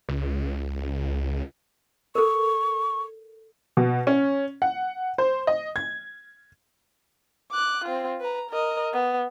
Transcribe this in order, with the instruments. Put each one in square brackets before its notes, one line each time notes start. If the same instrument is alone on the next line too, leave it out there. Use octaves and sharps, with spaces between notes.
[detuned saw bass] C#2
[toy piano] A4 A#4 [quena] C#6
[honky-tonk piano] B2
C#4
F#5
C5
D#5
G#6
[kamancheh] D6 F#6
C4 F4
B4 A#5
A#4 D#5
B3